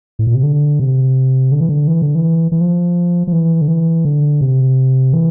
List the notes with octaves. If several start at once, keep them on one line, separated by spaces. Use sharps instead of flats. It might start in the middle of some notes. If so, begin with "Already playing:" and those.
A2
A#2
C3
D3
C3
D3
E3
D3
E3
D3
E3
E3
F3
F3
E3
D3
E3
D3
C3
E3